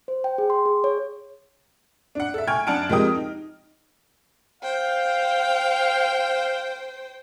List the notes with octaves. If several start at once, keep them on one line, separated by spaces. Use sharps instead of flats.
C5
G5
G#4
C6
G#4
C#5
D4 F#5
A4 E5
G5 G#5 C#6 F6 G#6
F#2 D4 F#5 A5 F6 D7
F2 G#3 G4 A#4 G5 D#6
D#4
C5 F5 G5